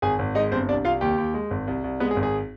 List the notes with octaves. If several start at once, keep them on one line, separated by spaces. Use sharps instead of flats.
G#1 G#4 G#5
G#1
G#3 D#4 D#5
G1 C4 C5
C2 D4 D5
C2 F4 F5
D#2 G4 G5
D#2
G#3
G#1
C2
C2
G#3 B3 B4
G#4
G#1
G#4